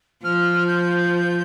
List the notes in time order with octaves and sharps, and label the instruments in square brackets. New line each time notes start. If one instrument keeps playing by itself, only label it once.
[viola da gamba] F3 [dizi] F6
[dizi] G6